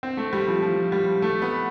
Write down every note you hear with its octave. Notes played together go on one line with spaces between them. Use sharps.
C4
A3
G3
F3
F3
G3
A3
B3